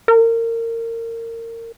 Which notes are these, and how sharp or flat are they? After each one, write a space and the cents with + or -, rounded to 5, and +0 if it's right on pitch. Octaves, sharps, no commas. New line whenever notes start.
A#4 -25